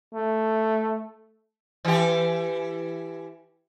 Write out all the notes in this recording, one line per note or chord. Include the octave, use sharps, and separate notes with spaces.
A3
E3 G4